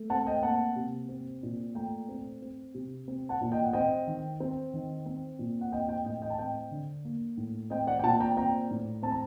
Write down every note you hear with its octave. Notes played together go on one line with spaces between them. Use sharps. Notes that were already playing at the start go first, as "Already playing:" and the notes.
Already playing: A3
C4 F#5 A5
D#5 G5
A#3 F#5 A5
C3
C4
A#2
A3 G5 A#5
C4
C4
C3
C4
F#5 A5
A#2
D#5 G5
F#5
C4 D#5 G5
D#3
C4
D#3
C4
A#2
F#5
C4 D#5 G5
D#5 G5
A2 D#5 G5
D#5 G5
A5
C4 D#5 G5
D3
A#3
A2
C4 D#5 G5
D5 F#5
G5
A#2 F#5 A5
G5 A#5
C4 G5 A#5
A2
C4 A5
A#5